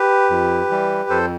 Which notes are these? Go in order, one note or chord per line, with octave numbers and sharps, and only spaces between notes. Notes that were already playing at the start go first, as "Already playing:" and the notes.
Already playing: G4 B4
F2
E3 G3
F2 A4 C5